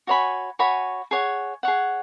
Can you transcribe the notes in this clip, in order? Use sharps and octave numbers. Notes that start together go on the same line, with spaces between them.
F#4 C#5 G#5 B5
F#4 C#5 G#5 B5
G#4 C#5 F#5
G#4 C#5 F#5